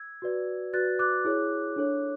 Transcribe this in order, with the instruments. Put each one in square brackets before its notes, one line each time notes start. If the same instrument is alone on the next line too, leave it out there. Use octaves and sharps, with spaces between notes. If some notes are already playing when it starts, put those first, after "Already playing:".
Already playing: [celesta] E6 G#6
F#4 B4 D5
F#4 B4 D5 F#6 A6
D6 F#6
E4 G#4 C#5
D4 A4 C#5